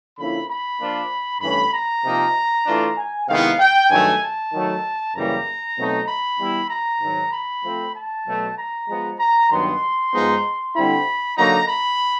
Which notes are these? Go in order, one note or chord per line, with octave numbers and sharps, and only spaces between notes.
D3 F3 A#3 C#4 E4 B5
B5
F3 A#3 D4 F4
G2 E3 A3 C#4 E4 B5
A#5
C3 F3 A#3 D#4
E3 A3 D4 F4
G#5
C3 D#3 G#3 B3 E4 F5
G5
G2 D#3 F#3 A3 G#5
A5
D#3 F#3 A3
F#2 C#3 E3 G3 A#3 A#5
B2 F#3 A3 C4 D#4
B5
E3 G3 B3 E4
A#5
G#2 D#3 F#3
B5
F3 A3 C4
A5
B2 F#3 A3
A#5
F3 G#3 B3
A#5
G2 D#3 F#3 B3 C6
G#2 F3 G#3 B3 D#4
D3 G3 C4 E4 B5
D3 F#3 A#3 D#4 A#5
B5